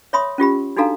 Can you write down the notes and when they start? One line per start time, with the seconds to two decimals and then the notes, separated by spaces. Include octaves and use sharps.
0.13 C#5 E5 B5 C6 D#6
0.38 C#4 F4 G4 B5
0.77 D4 D#4 F#4 A4 F5 A#5